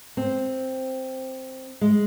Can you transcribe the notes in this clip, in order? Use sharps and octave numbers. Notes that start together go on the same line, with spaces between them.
C4
G#3